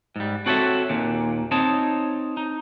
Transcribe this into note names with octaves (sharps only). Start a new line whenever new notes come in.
G#2 G3
C4 F#4 A4 C#5 D#5 E5
D#2 A#2
C4 D#4 C#5 A5
D#4